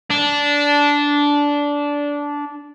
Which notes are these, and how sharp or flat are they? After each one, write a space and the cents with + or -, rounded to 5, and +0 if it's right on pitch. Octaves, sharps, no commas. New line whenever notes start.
D4 -15